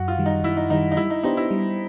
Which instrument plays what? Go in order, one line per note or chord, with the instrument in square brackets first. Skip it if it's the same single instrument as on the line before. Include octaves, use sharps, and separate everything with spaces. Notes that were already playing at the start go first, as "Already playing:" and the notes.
Already playing: [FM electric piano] F#2 [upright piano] F#4
[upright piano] F4
[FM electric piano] D#3 G3
[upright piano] D#4
[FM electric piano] F#2 [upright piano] E4
[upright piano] D#4
[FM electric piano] D#3 G3 [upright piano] D#4
[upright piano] D#4
[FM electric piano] G3 [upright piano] E4
[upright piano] D#4
[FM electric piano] B3 D4 G4 C5 [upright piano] D#4
[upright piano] E4
[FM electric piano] G3